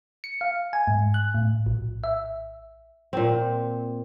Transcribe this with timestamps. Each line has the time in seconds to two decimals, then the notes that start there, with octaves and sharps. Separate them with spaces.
0.24 C#7
0.41 F5
0.73 G#5
0.87 G#2
1.14 F#6
1.34 A2
1.66 A#1
2.04 E5
3.13 A#2 C4